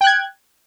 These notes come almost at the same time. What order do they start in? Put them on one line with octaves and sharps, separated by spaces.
G5 F#6 G#6